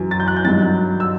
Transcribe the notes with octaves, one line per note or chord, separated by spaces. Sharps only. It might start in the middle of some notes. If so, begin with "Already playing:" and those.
Already playing: F#2 E3
A6
G6
F#6
G6
G2 D#3 F#3 A6
E6